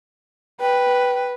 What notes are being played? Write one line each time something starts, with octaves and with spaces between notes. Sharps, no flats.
B4 G5